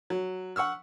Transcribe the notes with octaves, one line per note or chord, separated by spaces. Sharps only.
F#3
F#5 C#6 E6 F6